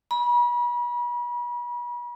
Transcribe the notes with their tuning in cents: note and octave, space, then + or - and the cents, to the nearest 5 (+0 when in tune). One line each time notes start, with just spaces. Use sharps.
B5 -40